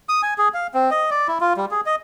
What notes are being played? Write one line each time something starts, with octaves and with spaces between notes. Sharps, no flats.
D#6
G#5
G#4
F5
C4
D#5
D5
E4
F4
G3
G#4
D#5